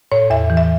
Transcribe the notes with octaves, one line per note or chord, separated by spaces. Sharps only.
A2 C#5
E2 E5
E3
E5